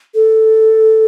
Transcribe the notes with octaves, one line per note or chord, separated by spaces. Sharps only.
A4